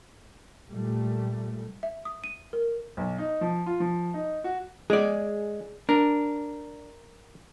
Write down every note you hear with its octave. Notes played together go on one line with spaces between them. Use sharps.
A#2 G3 A3
E5
D#6
D#7
A#4
B1
D#4
F3
F4
F3
D#4
F#4
G#3 G#4 D5
D4 A#4